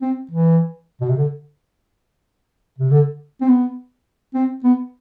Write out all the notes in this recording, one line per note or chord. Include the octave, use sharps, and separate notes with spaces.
C4
E3
B2
C3
D3
C3
D3
C4
B3
C4
B3